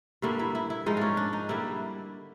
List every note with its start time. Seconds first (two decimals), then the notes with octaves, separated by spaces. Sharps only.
0.22 G2 D3 G3 A#3 E4
0.39 E4
0.55 E4
0.70 E4
0.86 G#2 F3 G#3 D#4
0.97 C#4 D4
1.17 D4
1.33 D#4
1.49 D3 G3 A#3 E4